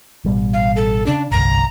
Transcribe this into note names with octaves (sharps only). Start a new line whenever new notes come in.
A1 B2 G3
F5
A4
C#3 C#4 D4
G1 C2 F2 A#5